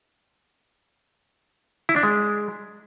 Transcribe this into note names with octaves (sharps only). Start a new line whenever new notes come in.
E4
D4
G#3